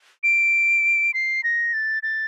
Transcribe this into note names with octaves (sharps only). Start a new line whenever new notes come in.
D7
C7
A#6
A6
A6